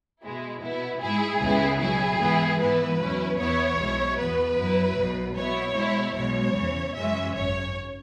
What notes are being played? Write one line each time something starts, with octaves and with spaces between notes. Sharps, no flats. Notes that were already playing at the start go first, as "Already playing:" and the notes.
B2 G#3 E4
B2 B3 E4
G#2 G#3 E4 G#4
C#2 C#3 G#3 B3 E4
B2 F#3 E4 G#4
G#2 E3 B3 E4
G#2 E3 B3 E4 B4
E2 B2 F#3 C#4 E4
E2 E3 B3 E4 C#5
B1 B2 G#3 E4
E2 E3 B3 B4
F#2 F#3 E4
B1 B2 F#3
B2 B3 E4 C#5
B2 G#3 E4
B1 B2 G#3 C#5
E2 C#3 E3
F#2 C#3 E3 G#3 C#4 E5
G#1 F#2 C#3 C#5